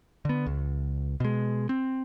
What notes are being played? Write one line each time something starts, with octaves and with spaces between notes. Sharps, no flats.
D3 B3
C#2
B2 G#3
C4